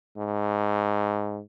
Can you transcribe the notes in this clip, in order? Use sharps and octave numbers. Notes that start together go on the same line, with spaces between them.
G#2